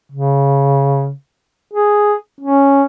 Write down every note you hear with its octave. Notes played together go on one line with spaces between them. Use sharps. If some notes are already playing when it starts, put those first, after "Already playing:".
C#3
G#4
C#4